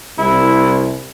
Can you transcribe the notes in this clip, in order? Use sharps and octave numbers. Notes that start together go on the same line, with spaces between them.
C2 E4